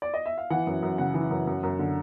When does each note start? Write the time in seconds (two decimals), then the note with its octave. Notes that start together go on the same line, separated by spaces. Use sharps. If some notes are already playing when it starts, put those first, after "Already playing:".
0.02 D5
0.14 D#5
0.26 E5
0.38 F5
0.50 E3 F#5
0.67 F#2
0.82 F#2
0.98 C#3 F#5
1.14 E3
1.31 F#2
1.47 F#2
1.63 F#2
1.79 D3